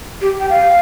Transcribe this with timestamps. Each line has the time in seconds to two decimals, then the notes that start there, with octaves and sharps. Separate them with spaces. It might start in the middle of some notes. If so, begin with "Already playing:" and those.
0.21 G4
0.40 G5
0.50 F5